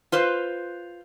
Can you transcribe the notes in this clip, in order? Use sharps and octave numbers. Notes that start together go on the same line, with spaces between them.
F4 B4 C5